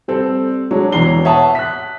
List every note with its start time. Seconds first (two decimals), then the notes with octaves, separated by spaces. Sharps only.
0.08 G3 C4 A4
0.71 F#3 G#3 D4 C#5
0.92 E1 E3 C#5 A#5 C7 G7
1.25 C#5 E5 F#5 A5 D#6
1.55 F#6 B6